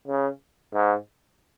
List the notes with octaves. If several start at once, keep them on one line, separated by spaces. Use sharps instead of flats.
C#3
G#2